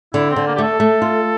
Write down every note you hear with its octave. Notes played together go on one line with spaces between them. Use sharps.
D3 E4
C4
D3
A#3
G4
A3 A4
A3
F4